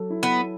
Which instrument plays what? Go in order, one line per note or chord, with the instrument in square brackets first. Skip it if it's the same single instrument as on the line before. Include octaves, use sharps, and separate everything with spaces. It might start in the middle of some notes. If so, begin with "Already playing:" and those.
Already playing: [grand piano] F#3 A4
E4
[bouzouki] B3